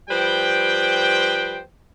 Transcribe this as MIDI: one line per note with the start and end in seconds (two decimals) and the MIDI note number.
0.10 1.61 53
0.10 1.61 55
0.10 1.61 71
0.10 1.61 72
0.10 1.61 79